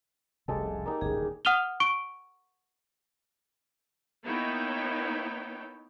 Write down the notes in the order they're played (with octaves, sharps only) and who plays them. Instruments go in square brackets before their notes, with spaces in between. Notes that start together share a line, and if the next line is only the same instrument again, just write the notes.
[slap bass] F1 C2 C#3 [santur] G#3 G4 A4
[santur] A#3 D#4 G4
[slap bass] G1 C#2 [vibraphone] G#4
[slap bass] D#1 D3
[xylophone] F#5 D#6 F6 D#7 F7 G7
C#6 D7 G7
[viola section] A#3 B3 D#4 E4 C#5 G5